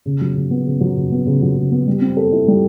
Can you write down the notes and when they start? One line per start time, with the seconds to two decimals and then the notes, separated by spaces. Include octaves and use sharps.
0.06 C#3
0.21 F#3
0.36 C#3
0.51 B3
0.67 C#3
0.81 F#3
0.96 C#3
1.12 B3
1.27 C#3
1.42 F#3
1.57 C#3
1.71 B3
1.87 G3
2.01 C4
2.17 A4
2.32 E4
2.48 G3